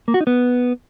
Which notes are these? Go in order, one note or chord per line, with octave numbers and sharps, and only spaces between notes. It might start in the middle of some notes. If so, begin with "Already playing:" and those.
A#3
F#4
D#4
B3